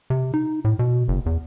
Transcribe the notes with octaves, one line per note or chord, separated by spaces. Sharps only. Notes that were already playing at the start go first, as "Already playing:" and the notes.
C3
D#4
A2
B2
F#1
E2